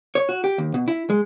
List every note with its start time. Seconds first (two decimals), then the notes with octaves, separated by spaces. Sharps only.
0.15 C#5
0.29 F#4
0.44 G4
0.58 D#2
0.74 B2
0.88 E4
1.10 G#3